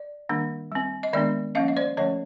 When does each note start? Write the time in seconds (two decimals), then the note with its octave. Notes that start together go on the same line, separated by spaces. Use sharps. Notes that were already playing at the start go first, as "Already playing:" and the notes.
Already playing: D5
0.29 D#3 G3 A#3 D4
0.72 G3 C4
1.03 D#5
1.13 D#3 G#3 B3 D4 D5 E5
1.55 F3 A#3 C#4 D#5 F5
1.68 D#5
1.77 C5 D5
1.97 D3 F3 A3 C#4 C#5 D#5